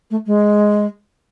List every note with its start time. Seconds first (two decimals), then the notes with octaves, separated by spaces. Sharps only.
0.10 A3
0.26 G#3